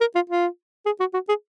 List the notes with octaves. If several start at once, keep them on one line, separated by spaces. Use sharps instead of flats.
A#4
F4
F4
G#4
F#4
F#4
G#4